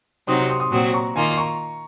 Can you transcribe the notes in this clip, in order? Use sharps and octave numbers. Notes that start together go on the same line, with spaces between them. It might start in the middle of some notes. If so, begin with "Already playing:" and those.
C3 F#3 C4 D#4 C6 D#6
C6 D#6
C6 D#6
A#2 F#3 C4 F#4 C6 D#6
A#5 C#6
D#3 A#3 F4 G#5 C6
C6
A#5 C#6